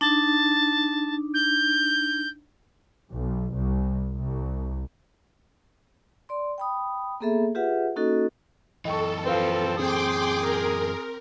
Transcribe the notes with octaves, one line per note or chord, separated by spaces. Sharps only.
D4 D#4 A5
G6
B1
C2
C2
D5 C6
G5 B5 D#6
A#3 B3 G#4 A4 E5
F4 G4 G#4 B4 E5 F#5
A#3 C#4 D#4 F#4 A4 D#5
F#2 E3 A4 D#5 G5 C#6
F3 C4 B4 F5
C4 G#4 A4 G5 C6 D6 D#6
A#4